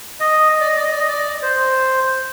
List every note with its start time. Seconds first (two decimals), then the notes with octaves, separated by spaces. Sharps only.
0.20 D#5
0.61 D5
0.68 D#5
0.76 D5
0.84 D#5
0.92 D5
0.99 D#5
1.08 D5
1.42 C5